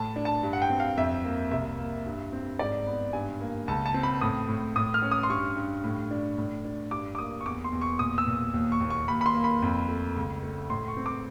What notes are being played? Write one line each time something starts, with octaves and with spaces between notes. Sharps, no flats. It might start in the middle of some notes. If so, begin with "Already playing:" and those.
Already playing: A2 A5
D4
A5
G2
F#5
G5
C4
F5
F2 E5
A#3
C2 E5
A#3
G2
C4
G#2 D5
B3
G2 G#5
A#3
C#2 A5
A5
C4
B5
A2 D#6
A2
A2 D#6
F6
C#4
D#6
C6
G2 C#6
G2
A2
D4
A2
D4
G2 D6
D6
A#3 D#6
C#6
E2 D6
C6
E2
C#6
A#2 D#6
E6
A#2
D#2
C#6
D#2
C#6
D#2 B5
B5
C6
A#3
B5
F2
A3
C#2
A3
A2 C6
C#6
C4
D6